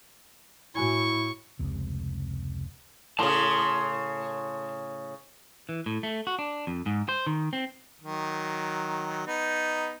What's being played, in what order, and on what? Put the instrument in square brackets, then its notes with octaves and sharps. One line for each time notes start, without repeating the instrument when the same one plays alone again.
[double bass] A2 [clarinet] E4 [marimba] F#4 G#5 G#6 [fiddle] C#6
[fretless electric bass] F1 C#2 C3
[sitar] A2 C#3 [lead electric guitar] A5 C6
[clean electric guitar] E3
A2
A3
F#4
D4
F2
G#2
C5
D#3
C4
[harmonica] D#3 F#3
B3 D#4